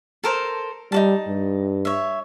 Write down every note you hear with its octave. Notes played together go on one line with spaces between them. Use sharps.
A4 A#4 C5
G3 D#4 F#4 A5
G2
C#5 E5